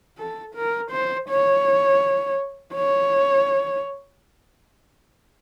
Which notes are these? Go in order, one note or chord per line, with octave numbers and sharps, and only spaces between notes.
A4
A#4
C5
C#5
C#5